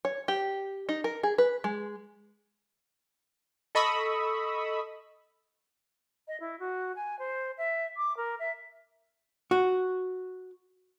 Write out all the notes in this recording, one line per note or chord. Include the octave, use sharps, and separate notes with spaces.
C#5
G4
D#4
A#4
G#4
B4
G#3
A4 D#5 B5 C#6 D#6 E6
D#5
E4
F#4
G#5
C5
E5
D6
A#4
E5
F#4